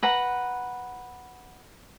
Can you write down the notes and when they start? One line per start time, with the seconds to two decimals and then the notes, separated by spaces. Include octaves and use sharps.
0.03 B4 F#5 A#5